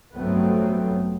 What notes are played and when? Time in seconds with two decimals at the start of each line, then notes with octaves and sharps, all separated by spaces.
0.14 A1 G2 F#3 A3 B3 C4